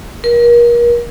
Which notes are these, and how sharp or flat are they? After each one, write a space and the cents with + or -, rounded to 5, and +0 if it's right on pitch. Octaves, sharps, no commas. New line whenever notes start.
A#4 +35